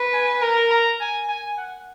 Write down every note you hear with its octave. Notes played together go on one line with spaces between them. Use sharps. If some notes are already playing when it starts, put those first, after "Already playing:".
Already playing: B4
G#5
A#4 A#5
A#5
G#5
G#5
F#5